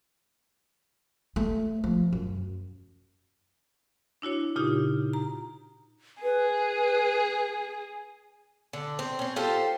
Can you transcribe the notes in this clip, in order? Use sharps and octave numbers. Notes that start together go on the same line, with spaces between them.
A3
F3
F#2
D4 E4 F#4 C#5
A#2 C#3 D#4 F4 G4
A#5
G#4 B4
D3
C4
C4 C#4
F4 G4 A4 C5